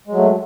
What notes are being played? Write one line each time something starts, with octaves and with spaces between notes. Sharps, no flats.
F#3 G#3 A3